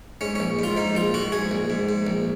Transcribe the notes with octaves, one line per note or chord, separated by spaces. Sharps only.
G#2 C#4
A#1 C#4
G#2 F4
G#2 D#4
A#1 F4
G#2 F#4
G#2 G#4
A#1
G#2
G#2
A#1